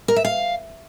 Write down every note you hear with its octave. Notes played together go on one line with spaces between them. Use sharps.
A#4
E5
F5